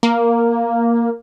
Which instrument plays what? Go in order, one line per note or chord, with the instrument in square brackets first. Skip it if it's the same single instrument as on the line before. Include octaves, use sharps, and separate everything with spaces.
[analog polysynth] A#3